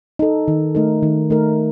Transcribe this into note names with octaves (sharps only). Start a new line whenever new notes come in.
D#4 A4
D#3
A3 D#4 A#4
D#3
A3 D#4 A#4